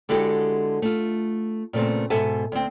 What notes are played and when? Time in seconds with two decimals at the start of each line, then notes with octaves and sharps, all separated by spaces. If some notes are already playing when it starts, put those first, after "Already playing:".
0.09 D3 G#3 E4 F#4 G4 A4
0.82 A3 F4
1.73 A#2 C#3 A3 B3 C4
2.10 G#2 B2 A4 E5 G#5 A5
2.52 D2 C4